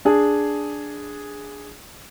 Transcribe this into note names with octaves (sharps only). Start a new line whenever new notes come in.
D4 G#4